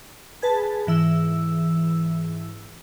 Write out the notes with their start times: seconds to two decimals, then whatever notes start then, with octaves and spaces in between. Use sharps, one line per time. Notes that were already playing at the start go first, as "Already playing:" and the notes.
0.42 G#4 B4 A5
0.87 G#2 E3 E6